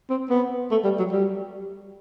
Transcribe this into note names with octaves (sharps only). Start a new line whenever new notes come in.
C4
B3
A3
G3
F#3
G3